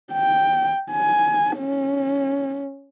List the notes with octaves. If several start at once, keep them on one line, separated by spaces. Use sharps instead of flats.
G5
G#5
C#4